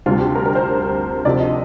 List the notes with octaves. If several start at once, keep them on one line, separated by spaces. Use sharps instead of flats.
D2 C3 G3 F4
G4
A#4
A#4
C5
D2 C3 F3 D5
D#5